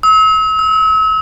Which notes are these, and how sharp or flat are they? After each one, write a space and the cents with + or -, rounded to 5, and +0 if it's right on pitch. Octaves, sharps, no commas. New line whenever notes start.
E6 -40
E6 +15